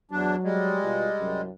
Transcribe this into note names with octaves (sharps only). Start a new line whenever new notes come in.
E2 F#3 D4
G3 G#3
B2 F4
C2 F#2